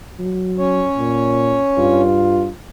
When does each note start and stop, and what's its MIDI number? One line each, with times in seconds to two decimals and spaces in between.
0.19 0.83 54
0.58 2.01 61
0.58 2.01 73
0.98 1.57 46
1.78 2.48 43
1.78 2.49 65